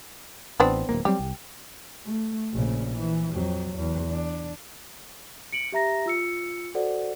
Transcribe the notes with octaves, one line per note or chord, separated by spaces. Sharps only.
A1 B3 C4 D4
D1 G1 A#3
F#3 G3 C4 G4
C2
A3
A#1 C#3
E3
F2 F#3
E2
D4
C#7 D7 F#7
G4 E5 A#5 A#6
F4 E6 C#7
F#4 A4 C5 D5 F#5